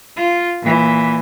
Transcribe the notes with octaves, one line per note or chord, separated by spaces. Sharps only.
F4
A#2 E3